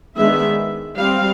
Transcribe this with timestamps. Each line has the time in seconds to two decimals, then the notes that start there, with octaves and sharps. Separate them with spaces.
0.16 D#3 G#3 B3 D4 E5
0.98 G3 C4 F5